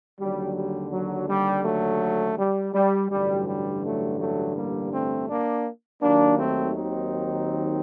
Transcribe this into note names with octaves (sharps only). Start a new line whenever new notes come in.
D#2 D3 F#3 G3
G3
F#3
G3
F#3 A3
G3
G3
A1 G2 D3 F#3 G3
G3
F#3 A3
F#3 A3
G3 A#3
A3 C4
A#3 D4
D#2 D#3 F#3 A#3 D4
A3 C4
C4 D#4